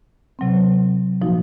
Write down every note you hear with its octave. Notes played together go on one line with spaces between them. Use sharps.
C3 F#3 C4
A#2 F3 A#3 D#4 F#4